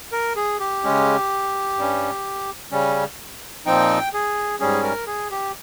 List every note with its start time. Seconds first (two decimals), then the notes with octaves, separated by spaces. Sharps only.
0.12 A#4
0.36 G#4
0.60 G4
0.84 C#3 G#3 C#4
1.77 G2 G3 C#4
2.71 C#3 G3 C#4
3.66 A#2 F3 C4 D#4 G5
4.14 G#4
4.60 G#2 G3 C#4 G#4
4.83 A#4
5.07 G#4
5.31 G4